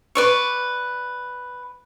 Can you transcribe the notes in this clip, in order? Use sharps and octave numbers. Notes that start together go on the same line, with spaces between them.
B4 D5 C#6